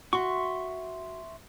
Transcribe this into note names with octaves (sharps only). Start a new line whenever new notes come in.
F#4 E5 C6 C#6